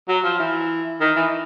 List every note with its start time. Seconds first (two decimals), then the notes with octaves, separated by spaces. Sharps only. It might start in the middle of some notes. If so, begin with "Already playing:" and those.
0.08 F#3
0.24 F3
0.39 E3
1.01 D#3
1.16 E3